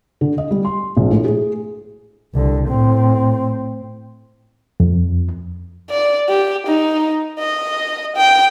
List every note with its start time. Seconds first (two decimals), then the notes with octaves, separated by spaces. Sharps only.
0.21 D3
0.38 D#5
0.51 G3
0.65 C6
0.97 A#1
1.10 A2
1.24 G#4
2.34 C2 D3
2.68 A2 C4
4.80 F2
5.90 D5
6.29 G4
6.67 D#4
7.39 D#5
8.17 G5